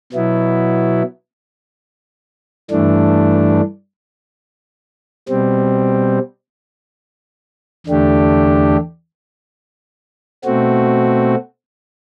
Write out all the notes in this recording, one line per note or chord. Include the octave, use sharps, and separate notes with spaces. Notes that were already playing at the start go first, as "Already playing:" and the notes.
B2 F#3 B3 E4
G2 E3 A3 D4
B2 G3 C4
E2 D3 A3 D4 G4
B2 A3 C4 F#4